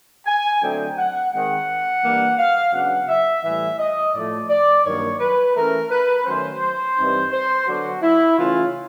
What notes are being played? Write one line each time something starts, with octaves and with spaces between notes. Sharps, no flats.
G#5
D3 F#3 A3 C4 D#4 G5
F#5
D#3 G#3 C4 F#5
E3 G3 A#3 D4
F5
C#3 F#3 B3 D4 F#5
E5
A2 E3 G3 E5
D#5
A2 F3 A3 D5
D5
G2 D#3 F#3 A#3 C#5
B4
E3 A3 C#4 A#4
B4
D#3 F#3 A3 C#4 C5
G2 E3 G3 C4 D#4
C5
D3 F#3 B3 D4 F#4
E4
C#3 E3 A3 C#4 F4